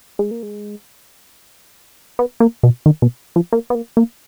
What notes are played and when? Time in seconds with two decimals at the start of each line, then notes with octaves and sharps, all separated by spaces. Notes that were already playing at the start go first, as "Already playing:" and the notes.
0.19 G#3
0.31 A#3
0.43 G#3
2.19 B3
2.40 A#3
2.63 B2
2.86 D#3
3.02 B2
3.36 F3
3.52 A#3
3.70 B3
3.75 A#3
3.97 A#3